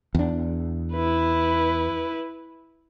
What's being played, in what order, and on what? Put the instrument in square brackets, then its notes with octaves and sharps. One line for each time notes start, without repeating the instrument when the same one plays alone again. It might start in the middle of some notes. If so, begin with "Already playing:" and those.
[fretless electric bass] E2 D4
[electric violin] E4 B4